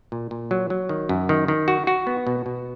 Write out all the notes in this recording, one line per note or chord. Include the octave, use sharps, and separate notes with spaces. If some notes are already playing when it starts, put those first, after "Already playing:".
A#2
A#2
F#3
F#3
D#3
F#2
D#3
D#3
F#4
F#4
B3
B2
B2